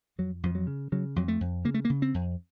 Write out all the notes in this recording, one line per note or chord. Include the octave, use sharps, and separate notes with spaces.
F2 F#3
F2 F3
F#3
C#3
C#3 F#3
F2 F#3
A3
F2
C#3 A#3
A3
A#3
C#3
C4
F2